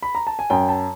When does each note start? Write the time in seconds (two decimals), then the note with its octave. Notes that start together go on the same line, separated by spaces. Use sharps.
0.03 B5
0.15 A#5
0.27 A5
0.39 G#5
0.50 F#2 G5
0.69 A5